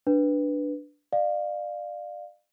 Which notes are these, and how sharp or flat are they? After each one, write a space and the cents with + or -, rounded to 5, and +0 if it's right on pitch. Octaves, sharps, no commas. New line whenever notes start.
D4 +0 B4 +0
D5 +40 F5 +0